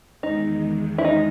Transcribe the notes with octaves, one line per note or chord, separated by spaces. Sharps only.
E2 D#3 G#3 D#4
E4
D#4